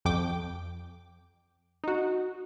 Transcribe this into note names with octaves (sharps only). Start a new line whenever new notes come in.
F2 G5 D6
D#4 F#4